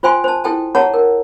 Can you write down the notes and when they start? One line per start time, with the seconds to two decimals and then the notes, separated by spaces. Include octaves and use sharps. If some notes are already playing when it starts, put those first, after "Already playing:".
0.03 F4 C5 G5 G#5 C6
0.24 C5 A5
0.44 E4 A4 G5 A5
0.75 G#4 C#5 F#5 A5 A#5
0.94 A#4